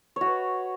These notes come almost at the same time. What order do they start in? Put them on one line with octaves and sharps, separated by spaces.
C#5 F#4 B4